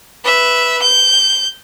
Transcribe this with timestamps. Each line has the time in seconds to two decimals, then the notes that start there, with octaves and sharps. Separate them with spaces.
0.25 B4 E5
0.82 G6